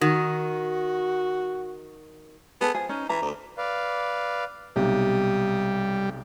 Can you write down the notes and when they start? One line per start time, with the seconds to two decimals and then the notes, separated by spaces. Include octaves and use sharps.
0.01 D#3 F#4
2.61 B3 G#4 A4
2.75 F3 G#4
2.89 C#4 D#4
3.09 E3 A#5
3.22 D2
3.58 B4 D5 F5
4.76 B1 C3 G3 D#6